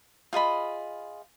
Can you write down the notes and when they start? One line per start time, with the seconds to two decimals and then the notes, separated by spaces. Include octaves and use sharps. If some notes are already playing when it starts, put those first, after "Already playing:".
0.33 F4 G#4 D#5 B5